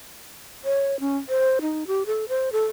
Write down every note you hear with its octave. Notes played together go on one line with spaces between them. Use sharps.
C#5
C#4
C5
D#4
G4
A4
C5
A4